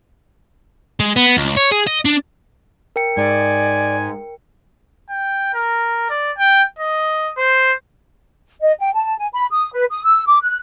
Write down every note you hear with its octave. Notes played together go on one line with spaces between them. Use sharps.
G#3
B3
C#2
C#5
G#4
D#5
D4
A#4 G5 C#7
G#2 D5 G#5
G5
A#4
D5
G5
D#5
C5
D#5
G5
A5
G#5
B5
D#6
B4
D#6
E6
D6
F#6